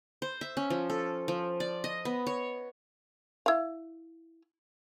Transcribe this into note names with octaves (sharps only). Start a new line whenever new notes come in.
C5
E5
C#4
F3
A4
F3
D5
D#5
B3
C#5
E4 F5